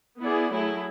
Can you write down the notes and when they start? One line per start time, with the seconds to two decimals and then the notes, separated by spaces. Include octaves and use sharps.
0.21 B3 E4 G#4 D5
0.51 F#3 A3 E4 G#4